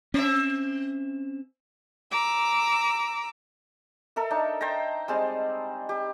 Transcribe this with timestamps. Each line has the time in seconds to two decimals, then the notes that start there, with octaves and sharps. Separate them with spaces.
0.14 C4 C#4 E5
2.11 A#5 D6 E6
4.16 A4 A#4 E5
4.30 D4 D#4 E5
4.61 C5 G5 A5 A#5
5.08 G3 G#3 C4 A5
5.89 G4